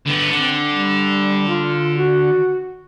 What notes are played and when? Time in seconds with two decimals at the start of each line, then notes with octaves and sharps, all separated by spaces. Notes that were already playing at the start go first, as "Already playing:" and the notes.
0.07 D3 B3
0.31 D3 C4
0.70 G3
1.48 F4
1.96 F#4